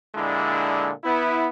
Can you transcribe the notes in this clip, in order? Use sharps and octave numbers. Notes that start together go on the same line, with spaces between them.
A#2 D3 G#3 D4 E4
B3 E4